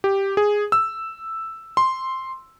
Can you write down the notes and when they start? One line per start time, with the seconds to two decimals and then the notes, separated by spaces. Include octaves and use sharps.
0.04 G4
0.37 G#4
0.72 E6
1.77 C6